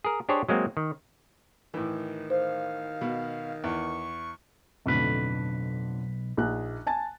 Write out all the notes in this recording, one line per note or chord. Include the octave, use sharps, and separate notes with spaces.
G#4 A#4
D4 G4 G#4 C5 C#5
F#3 G#3 A#3 C4
D#3
A2 D#3 E3
C5 F5
B2
E2 C#6
B1 F2 A2 D3 B4
A#1 D#4 F#6
G#5 A5 A6